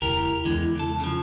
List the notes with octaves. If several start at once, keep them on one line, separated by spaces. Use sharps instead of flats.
E1 C#2 E4 G4 A#4
E2 D3 G#3
C#2 A4
C#3 F3